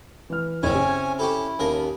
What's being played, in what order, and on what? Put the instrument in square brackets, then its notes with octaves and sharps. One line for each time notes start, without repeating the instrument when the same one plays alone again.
[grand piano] E3 F6
[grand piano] F#1 [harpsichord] C4 E4 [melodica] C#4 C#5 G#5
[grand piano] C#3
[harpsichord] C#4 G4 A4 [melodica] E4
[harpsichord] D#2 G#4 A#4 [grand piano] C#4 A5